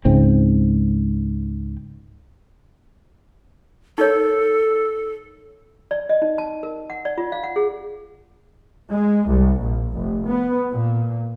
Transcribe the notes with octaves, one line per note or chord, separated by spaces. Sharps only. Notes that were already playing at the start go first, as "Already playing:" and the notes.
C#2 G#2 C4
D#4 A4 A#4 C#5
D5
D#5
D#4
A5
A#4
F#5
D5
F4
F5
F#5
G#4
G#3
C2
A#1
F1
B3
A#2